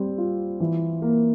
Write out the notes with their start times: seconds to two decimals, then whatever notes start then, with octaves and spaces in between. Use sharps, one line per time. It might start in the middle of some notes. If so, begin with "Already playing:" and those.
Already playing: G3 C4
0.18 F4
0.60 E3
1.02 A#3